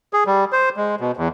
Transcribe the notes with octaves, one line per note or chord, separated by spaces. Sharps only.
G#4
G3
C5
G#3
B2
E2